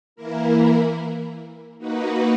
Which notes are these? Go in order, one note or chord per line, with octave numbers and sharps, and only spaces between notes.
E3 A#3 E4 A#4
A#3 D#4 F#4 B4